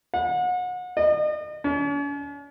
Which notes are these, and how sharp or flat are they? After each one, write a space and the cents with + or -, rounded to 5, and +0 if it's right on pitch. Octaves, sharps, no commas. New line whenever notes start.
F#5 -35
D#5 -40
C#4 +45